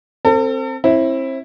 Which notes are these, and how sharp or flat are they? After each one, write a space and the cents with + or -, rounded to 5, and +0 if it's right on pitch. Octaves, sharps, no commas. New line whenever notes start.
C4 +10 A4 +40
C4 +35 E4 +0